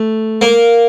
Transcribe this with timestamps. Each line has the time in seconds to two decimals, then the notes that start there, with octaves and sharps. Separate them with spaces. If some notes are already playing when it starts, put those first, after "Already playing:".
Already playing: A3
0.41 A#3